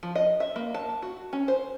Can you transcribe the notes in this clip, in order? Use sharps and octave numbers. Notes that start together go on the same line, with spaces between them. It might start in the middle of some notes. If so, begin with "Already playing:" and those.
F3
D#5
E5
A#3
A5
F#4
C#4
C5